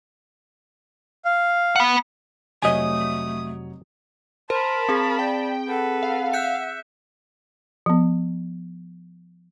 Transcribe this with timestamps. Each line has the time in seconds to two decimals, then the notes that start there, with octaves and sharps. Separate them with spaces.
1.25 F5
1.76 F#5 B5
2.62 F1 F#3 A3 C#5 D#5 G#5 D#6
4.50 A#4 C5 A5 B5 C6
4.89 C4 G#4
5.19 D5 G5
5.68 A4 B4 F#5
6.03 F5
6.33 E5 F#6 G6 C#7
7.86 F3 B3